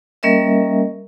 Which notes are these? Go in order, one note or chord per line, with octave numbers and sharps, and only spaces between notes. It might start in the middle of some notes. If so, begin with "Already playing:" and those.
G3 A#3 C#4 A#4 D#5 E5